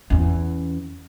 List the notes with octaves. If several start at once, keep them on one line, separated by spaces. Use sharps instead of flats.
E2 C#4